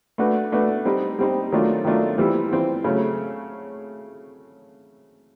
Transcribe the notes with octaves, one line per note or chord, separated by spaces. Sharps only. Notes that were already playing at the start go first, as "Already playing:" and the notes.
A3 D4 F#4 B4
A3 D4 F#4 B4
G3 C4 D#4
G3 C4 D#4
D#3 F#3 A3 D4 F4
D#3 F#3 A3 D4 F4
E3 G3 C4 F4
E3 G3 C4 F4
C#3 F#3 A3 C#4